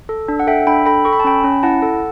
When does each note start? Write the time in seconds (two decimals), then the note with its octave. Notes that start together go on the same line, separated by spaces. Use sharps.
0.09 A4
0.28 D4
0.40 F#5
0.47 A4 E5 G5
0.67 D4 G5 B5
0.86 A4 G5 B5
1.05 A4 C#6
1.13 B5
1.20 A5
1.24 C#4 G5 B5
1.44 C#4
1.63 E4 F#5 A5
1.82 A4